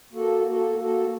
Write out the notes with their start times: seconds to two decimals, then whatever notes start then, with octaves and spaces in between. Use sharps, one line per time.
0.12 A#3 F#4 A4
0.44 A#3 F#4 A4
0.77 A#3 F#4 A4